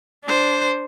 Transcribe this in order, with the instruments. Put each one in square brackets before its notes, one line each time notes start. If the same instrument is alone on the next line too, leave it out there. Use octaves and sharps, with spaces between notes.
[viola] D4 C5